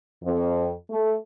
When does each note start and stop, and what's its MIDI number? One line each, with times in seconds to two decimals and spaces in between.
0.24 0.70 41
0.91 1.14 57